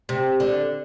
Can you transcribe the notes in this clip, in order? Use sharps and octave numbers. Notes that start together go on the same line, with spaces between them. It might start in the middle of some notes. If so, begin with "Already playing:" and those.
C3
D3